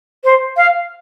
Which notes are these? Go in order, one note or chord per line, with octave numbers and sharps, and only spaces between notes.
C5
F5